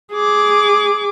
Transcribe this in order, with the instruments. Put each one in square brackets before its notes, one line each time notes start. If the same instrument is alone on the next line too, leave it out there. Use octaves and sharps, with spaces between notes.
[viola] G#4 D6